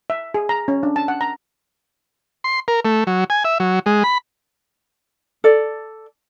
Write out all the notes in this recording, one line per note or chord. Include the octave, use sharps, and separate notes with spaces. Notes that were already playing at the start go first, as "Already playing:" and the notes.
E5
G#4
A#5
C#4
D4
A5
F#5
A#5
C6
A#4
A3
F#3
G#5
E5
F#3
G#3
B5
A4 D5